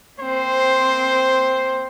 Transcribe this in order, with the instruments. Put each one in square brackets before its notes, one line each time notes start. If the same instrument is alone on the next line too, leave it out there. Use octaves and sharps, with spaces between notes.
[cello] A#3 C4 [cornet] C5